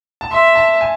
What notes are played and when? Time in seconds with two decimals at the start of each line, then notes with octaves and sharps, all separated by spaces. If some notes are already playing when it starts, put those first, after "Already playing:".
0.21 A5
0.31 E5 C6
0.55 A5
0.81 G#5